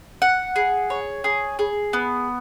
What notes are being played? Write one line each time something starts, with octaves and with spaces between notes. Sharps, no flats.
F#5
G#4
C#5
G#4
G#4
B3